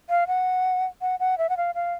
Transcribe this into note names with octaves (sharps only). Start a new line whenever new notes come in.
F5
F#5
F#5
F#5
E5
F#5
F5
F5